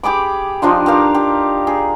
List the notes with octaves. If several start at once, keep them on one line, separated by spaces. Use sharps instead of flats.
G4 G#4 B5 D6
F3 D4 D#4 F4
G4 A#4 F5
G4
G#4